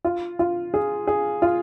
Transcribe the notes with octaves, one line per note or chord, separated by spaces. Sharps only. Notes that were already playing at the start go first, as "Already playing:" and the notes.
F4
F4
G#4
G#4
F4